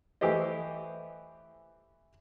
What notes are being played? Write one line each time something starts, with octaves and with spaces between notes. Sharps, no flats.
E3 A3 G4 C5 D#5